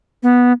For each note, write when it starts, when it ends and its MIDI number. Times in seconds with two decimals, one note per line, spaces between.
0.23 0.53 59